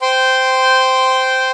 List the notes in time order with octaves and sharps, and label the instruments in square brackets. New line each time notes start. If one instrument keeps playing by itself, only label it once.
[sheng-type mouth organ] C5 G5 C6